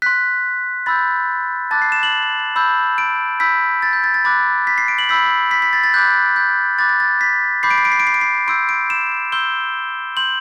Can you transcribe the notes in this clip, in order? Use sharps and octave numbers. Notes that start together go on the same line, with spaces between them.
C6 F#6 B6
B5 E6 G6 A6
A5 D6 F#6 A6
C7
E7
F#7
B5 E6 G6
D7
B5 E6 G6 B6
A6
G6
A6
A6
B5 D6 F#6 A6
B6
C7
D7
F#7
B5 E6 G6 B6
B6
B6
A6
A6
B5 D6 F#6 G6
G6
B5 D6 F#6 A6
A6
A6
B6
B5 D6 G6 C7
D7
C7
D7
C7
D7
C7
D7
C7
C6 E6 G6 D7
D7
E7
C6 E6 G6 G7
C6 G6 F#7